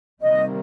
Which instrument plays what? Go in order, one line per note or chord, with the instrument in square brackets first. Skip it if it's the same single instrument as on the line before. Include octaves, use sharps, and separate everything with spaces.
[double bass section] C3 D#3 G3 A#3 [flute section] D#5